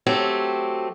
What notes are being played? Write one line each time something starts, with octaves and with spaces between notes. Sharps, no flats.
F#3 A3 C4 G4